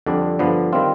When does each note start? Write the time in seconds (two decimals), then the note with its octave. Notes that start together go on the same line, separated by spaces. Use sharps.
0.06 F2 D3 G3 D4
0.39 G2 D3 F3 B3
0.73 D#3 G3 C4 F4